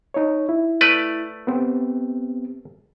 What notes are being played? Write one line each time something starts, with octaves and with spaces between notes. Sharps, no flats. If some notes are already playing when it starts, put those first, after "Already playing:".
D#4 C#5
E4
A3 B4 D5
B3 C4 G4